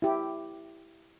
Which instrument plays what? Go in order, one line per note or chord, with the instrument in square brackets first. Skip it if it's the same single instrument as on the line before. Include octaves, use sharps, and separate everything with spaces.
[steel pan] E4 G4